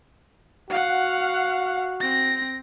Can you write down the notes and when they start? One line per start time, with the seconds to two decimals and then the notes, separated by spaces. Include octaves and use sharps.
0.70 F#4 F5 F#5
2.01 C4 A#6